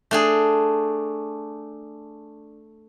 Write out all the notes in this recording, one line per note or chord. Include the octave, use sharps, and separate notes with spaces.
A3 D4 G#4